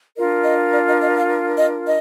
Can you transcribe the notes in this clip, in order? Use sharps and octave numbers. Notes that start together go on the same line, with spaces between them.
D4 F4 A#4 D#5
D#5
D5
D#5
D#5
F5
D#5
D#5